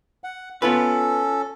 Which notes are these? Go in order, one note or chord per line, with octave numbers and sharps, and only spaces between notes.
F#5
B3 C#4 F4 A4 B4